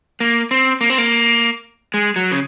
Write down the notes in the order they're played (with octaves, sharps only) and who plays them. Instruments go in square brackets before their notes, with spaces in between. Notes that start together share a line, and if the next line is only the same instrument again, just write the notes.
[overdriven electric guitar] A#3
C4
A#3
C4
A#3
G#3
F#3
C#3